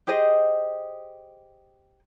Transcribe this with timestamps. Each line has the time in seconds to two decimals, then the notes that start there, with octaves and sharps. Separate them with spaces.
0.07 G4 G#4 C5 D#5